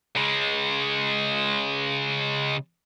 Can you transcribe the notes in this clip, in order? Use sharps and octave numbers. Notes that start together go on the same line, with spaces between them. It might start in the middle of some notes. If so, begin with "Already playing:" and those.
C#3 G#3